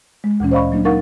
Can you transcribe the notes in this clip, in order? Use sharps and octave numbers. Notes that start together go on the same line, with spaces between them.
G#3
D2 A#2 E3 C#4
C5 D5 D#5 F5 B5 C#6
F#3 A#3 D4
D#4 A#4 F5 F#5 C#6 A6